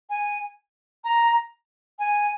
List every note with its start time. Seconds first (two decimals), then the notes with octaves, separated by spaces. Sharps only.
0.10 G#5
1.04 A#5
1.99 G#5